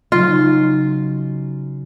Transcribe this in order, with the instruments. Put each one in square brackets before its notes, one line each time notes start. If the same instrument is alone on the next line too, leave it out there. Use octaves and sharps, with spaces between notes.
[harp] C#3 F#3 D#4 [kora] F4